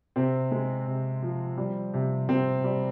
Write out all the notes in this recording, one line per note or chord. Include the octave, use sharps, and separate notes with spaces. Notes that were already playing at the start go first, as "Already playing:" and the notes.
C3 C4
G#3
C3
F3
G3
C3
C3 C4
G3